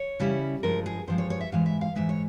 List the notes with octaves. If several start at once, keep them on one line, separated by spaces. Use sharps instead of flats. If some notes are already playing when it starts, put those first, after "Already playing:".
Already playing: C#5
C#3 G3 C#4 E4
G2 F3 G#3 A#4
G#4
G2 F3 G#3 C5
C#5
C#5
E5
G#2 E3 G#3 F5
E5
F5
G#2 E3 G#3 E5
C#5